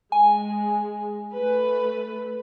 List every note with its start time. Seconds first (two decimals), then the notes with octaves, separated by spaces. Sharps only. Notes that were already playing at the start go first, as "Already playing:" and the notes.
0.12 G#3 G#5
1.34 A3 B4